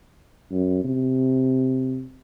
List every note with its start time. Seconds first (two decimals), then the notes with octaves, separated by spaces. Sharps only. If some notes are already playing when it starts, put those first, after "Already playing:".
0.51 F#2
0.84 C3